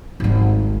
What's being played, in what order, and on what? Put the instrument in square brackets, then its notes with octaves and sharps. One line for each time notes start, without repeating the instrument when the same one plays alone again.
[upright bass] G#1 G3